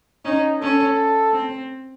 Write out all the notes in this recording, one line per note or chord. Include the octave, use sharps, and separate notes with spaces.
C#4 D#4
C#4 A4
C4